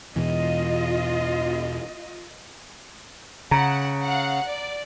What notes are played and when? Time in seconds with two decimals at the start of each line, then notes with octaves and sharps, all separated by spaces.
0.16 E2 B2 E3 F4 D#5
3.51 C#3 F#5 A#5
4.02 F5 F#5
4.47 D5